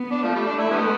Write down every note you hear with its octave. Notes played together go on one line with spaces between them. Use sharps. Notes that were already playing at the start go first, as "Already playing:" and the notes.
Already playing: B3
D4
F3 A3
G3
D4
E4
D3 G3 B3